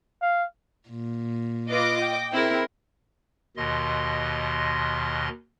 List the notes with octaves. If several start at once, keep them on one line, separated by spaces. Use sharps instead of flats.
F5
A#2
F4 B4 D#5 D6
G5
C4 E4 G#4 A#4
D#2 B2 D#3 D#5 C6